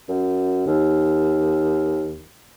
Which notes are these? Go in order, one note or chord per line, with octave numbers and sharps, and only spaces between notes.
F#2
D#2